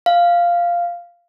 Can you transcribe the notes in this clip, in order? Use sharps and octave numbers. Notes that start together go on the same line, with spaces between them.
F5